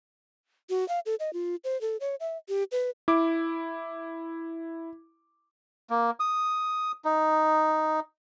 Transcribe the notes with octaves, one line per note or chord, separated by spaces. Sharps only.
F#4
F5
A4
D#5
F4
C5
A4
C#5
E5
G4
B4
E4 D6
A#3
D#6
D#4